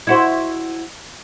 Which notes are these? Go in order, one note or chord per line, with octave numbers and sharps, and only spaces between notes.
E4 F#4 C5